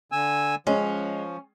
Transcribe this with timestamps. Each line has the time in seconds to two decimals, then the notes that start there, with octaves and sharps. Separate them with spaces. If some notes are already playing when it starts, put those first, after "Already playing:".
0.12 D3 G#5 E6
0.67 F3 G#3 C#4